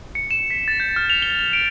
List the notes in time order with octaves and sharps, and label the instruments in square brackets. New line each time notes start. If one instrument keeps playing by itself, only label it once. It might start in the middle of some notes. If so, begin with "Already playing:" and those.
[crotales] C#7
E7
B6
A6
G6
F6
F7
G7
G7
D7